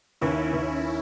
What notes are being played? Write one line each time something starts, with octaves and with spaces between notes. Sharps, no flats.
D#2 C#4 E4
D#2